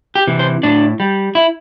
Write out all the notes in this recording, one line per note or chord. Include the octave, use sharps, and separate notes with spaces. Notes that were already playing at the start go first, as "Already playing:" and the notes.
G4
C3 E3
C5
A2 D4
G3
E4